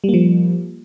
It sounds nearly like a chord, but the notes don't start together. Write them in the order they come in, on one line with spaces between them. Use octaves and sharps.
G3 A#3 F3